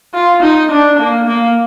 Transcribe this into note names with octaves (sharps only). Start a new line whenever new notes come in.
F4
D#4
D4
A#3
A#3